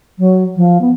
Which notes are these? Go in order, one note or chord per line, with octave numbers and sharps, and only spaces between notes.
F#3
F3
B3